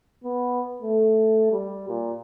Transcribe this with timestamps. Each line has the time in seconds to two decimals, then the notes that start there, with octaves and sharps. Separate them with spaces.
0.24 B3
0.82 A3
1.52 G3
1.89 A#2